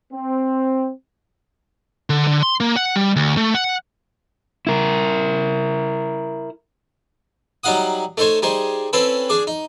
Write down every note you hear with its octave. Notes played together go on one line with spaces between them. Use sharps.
C4
D3
D3
C6
A#3
F#5
G3
D2
A3
F#5
E4 A#4
F#3 G3 D#4 F5 F#5 D#6
A3 D#4 A4 C5 C#5 G#5
G3 D#4 G#4 C5
C4 C#4 E4 A4 B4
D4 G#4 D6
D#4